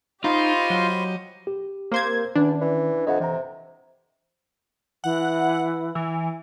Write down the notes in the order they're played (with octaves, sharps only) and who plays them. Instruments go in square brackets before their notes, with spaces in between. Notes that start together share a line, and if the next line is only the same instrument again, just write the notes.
[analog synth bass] D#4 [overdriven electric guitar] F4 [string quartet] G4 D#5 [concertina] C5 B5 C#6
[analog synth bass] F#3
[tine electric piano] G4
[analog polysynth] A#3 C5 G#6 [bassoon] C4
[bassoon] E2 [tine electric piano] D#3 C#4 [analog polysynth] D4
[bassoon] E3
[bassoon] F2 [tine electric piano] D#5 E5 F#5
[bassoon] C3 [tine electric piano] E3 A#5
[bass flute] E3 [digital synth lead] F#5
[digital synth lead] E3